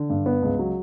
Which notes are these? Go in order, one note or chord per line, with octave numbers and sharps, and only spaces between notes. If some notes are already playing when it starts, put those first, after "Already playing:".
Already playing: D3
G2
B3
C#2
F#3